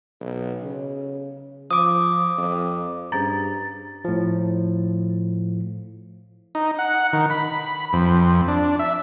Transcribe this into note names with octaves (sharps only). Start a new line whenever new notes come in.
B1
C#3
F3 D6 D#6
F2
G2 C#4 G#4 C5 A#5 A6
A2 F3
D#4
F#5
D#3
B5
F2
D4
E5